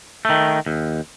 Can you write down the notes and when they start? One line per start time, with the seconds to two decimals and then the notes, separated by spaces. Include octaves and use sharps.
0.25 D#3 A3
0.66 D#2